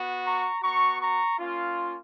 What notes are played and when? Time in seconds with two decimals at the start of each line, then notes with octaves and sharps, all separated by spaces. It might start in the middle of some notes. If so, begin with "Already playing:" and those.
Already playing: B3 F#4
0.25 A#5 C#6
0.62 B3 F#4 A#5 C#6
1.00 A#5 C#6
1.38 A#3 C#4 F4